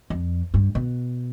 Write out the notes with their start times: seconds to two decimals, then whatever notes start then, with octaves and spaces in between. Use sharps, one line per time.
0.10 F2
0.54 G2
0.75 B2